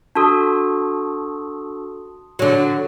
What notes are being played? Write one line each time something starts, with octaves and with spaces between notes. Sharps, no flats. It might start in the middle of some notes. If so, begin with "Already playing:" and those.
D4 F#4 A4 A5 C6 D#6
D3 F#3